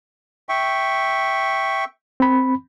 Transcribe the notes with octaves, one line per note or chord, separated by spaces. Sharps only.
E5 G5 C#6
C4 B5